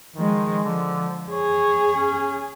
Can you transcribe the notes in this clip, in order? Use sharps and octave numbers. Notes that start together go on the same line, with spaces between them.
D#3 F3 G#3
D3 F3
G#4 C#5
C#4